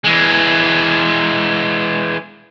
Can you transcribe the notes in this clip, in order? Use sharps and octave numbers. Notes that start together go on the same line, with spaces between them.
E3 G#3